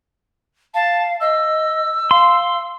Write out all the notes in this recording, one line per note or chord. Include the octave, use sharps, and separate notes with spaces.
F5 A5
D#5 E6
F5 C6